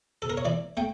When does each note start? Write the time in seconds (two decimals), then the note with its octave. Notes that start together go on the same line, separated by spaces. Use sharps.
0.22 A4
0.30 A#4
0.37 C#5
0.45 E3 D5
0.77 A3 G5